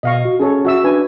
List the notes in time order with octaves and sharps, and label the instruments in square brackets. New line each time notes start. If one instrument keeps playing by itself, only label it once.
[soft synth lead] B2 [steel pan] D#5 F5 C#6
[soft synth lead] F#4
[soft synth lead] C#4 [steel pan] G#4 A4 C#5
[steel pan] F#4 E5 E6
[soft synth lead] D4 [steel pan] B4 G#5